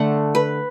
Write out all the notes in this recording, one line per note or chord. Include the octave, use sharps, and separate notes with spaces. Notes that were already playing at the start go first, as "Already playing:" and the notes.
Already playing: D3 A3 F#5
B4